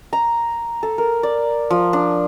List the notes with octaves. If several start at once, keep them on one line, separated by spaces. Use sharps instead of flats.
A#5
A4
A#4
D5
F3
D4